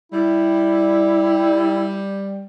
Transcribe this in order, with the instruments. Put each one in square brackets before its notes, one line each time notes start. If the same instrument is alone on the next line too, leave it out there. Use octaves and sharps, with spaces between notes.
[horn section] G3 [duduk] E4